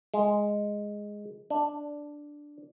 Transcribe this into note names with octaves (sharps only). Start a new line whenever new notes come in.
G#3
D4